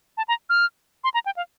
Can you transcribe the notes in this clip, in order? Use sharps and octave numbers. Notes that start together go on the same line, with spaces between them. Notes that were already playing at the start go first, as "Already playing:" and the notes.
A5
A#5
F6
C6
A#5
G5
F5